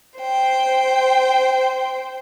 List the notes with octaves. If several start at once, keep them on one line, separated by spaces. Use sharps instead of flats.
C5 G5